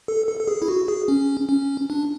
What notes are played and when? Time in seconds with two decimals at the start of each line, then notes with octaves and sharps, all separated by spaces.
0.08 A4
0.28 A4
0.40 A4
0.48 G#4
0.62 E4
0.68 F#4
0.88 G#4
1.08 C#4
1.49 C#4
1.90 D4